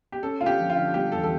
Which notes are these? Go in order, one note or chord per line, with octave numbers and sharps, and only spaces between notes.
G4
C#4 A4
D3 F4
G4
F3
F4
D3
G3 G4
E2 A4
A4